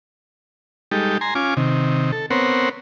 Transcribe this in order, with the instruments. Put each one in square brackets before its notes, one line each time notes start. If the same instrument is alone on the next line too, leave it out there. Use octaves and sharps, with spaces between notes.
[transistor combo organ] G3 G#3 D#4 G4 A4
G#5 A#5 C6
C#4 F4 G#5 D6
C3 D#3
A4
B3 C4 A#4 C5 C#5 F#5